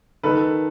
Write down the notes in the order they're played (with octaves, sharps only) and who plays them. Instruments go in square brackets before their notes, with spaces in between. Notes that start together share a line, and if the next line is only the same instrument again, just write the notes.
[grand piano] D#3 A4 B4